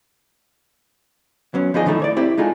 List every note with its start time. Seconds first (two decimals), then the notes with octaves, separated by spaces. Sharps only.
1.54 F#3 B3 C#4
1.74 F3 B3 D4 D#4 G#4 D#5
1.86 D#3 F3 A3 D#4 E4 A4
2.00 E3 C#5 D5
2.16 C4 E4 G4
2.37 G#3 D#4 F4 G#4 A4